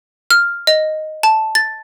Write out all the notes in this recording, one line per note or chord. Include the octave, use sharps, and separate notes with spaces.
F6
D#5
A5
A6